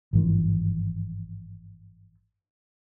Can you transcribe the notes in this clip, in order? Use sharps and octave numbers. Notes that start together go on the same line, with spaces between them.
G#1 G2 E3 F3